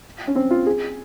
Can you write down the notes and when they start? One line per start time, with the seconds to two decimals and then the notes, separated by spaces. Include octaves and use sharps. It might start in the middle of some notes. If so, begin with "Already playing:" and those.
0.27 C#4
0.35 C4
0.51 F4
0.66 G#4